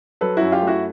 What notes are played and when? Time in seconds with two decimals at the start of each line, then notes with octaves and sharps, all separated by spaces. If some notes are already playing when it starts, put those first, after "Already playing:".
0.21 F#3 A4 B4
0.37 F#2 E4 F#4
0.52 F4 G4
0.62 A3
0.67 E4 F#4